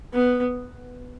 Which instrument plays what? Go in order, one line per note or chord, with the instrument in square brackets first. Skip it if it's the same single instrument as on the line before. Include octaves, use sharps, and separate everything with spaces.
[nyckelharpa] B3